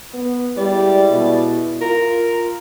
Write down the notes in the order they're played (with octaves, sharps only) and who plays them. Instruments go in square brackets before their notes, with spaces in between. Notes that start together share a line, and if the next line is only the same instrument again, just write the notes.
[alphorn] B3
[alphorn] G3 [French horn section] G#3 E4 [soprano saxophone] D5
[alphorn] B2
[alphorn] F4 [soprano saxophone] A#4